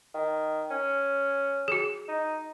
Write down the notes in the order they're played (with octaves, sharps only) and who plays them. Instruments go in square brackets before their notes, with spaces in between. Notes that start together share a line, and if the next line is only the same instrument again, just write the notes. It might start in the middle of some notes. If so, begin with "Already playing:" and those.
[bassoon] D#3
C#4
[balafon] F#4 G#4
[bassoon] D#4